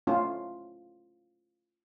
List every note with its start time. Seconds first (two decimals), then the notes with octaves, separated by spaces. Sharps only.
0.07 A3 C#4 F4